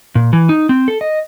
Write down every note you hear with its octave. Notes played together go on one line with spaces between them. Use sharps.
A#2
E3
D#4
C4
A4
D#5